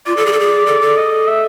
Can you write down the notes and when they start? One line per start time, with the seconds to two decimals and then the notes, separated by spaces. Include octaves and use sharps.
0.06 F4 D5
0.17 A4
0.26 G#4
0.33 A4
0.40 G#4
0.67 A4
0.81 A4
0.97 D#5
1.27 E5